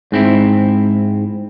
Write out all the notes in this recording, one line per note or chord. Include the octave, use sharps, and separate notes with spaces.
G#2 C4 E4